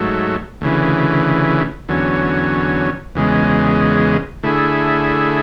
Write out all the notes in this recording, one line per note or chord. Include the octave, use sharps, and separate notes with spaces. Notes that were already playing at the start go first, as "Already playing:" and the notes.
Already playing: G#2 F#3 A3
D2 C#3 E3
E2 D3 F#3 C#4
E2 C#3 G#3
D3 A3 E4 G#4